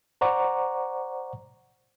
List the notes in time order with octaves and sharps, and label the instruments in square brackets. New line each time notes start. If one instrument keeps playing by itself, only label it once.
[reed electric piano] C5 D5 F#5 A#5 C#6 D6